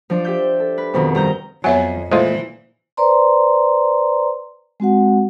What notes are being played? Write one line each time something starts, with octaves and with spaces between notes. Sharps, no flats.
F3 D4 D5
G4 E5 G6
A4
B4
F2 B2 D#3 C4
G2 A#5 G6
F2 F#3 B3 C#5 E5 G#5
A#2 E3 G#3 A3 F4 C5
B4 C5 D5 A#5 C6
G#3 C4 F#4 F#5